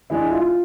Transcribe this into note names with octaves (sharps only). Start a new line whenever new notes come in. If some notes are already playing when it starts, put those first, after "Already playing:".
E3 G#3 D4 E4
F4